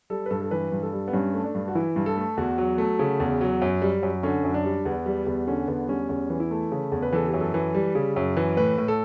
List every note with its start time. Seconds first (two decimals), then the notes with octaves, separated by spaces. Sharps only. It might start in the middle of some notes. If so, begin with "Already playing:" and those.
0.10 G3 A4
0.26 B4
0.30 G2 A4
0.42 A4
0.51 E3 B4
0.72 G2
0.82 A4
0.93 G3
1.08 B3
1.13 G2 C#4
1.34 A3
1.44 D4
1.55 G2
1.68 F#4
1.75 E3 E4
1.96 G2
2.06 A4
2.17 A3
2.37 E2 F#4
2.58 F#3
2.78 A3
2.99 C#3
3.20 E2
3.41 F#3
3.62 F#2
3.82 G3
4.03 F#2
4.23 D3 C#4
4.44 F#2
4.54 D4
4.64 G3
4.85 E2 B3
5.06 G3
5.27 E2
5.47 D3 C#4
5.68 E2 B3
5.88 G3 C#4
6.09 E2 C#4
6.30 E3
6.40 E4
6.51 A3
6.72 C#3
6.92 E2
7.02 B4
7.12 E3 A4
7.27 G4
7.33 F#2
7.40 A4
7.54 E3
7.75 G3
7.95 C#3
8.16 F#2
8.37 E3
8.57 A2 B4
8.78 A2
8.88 A4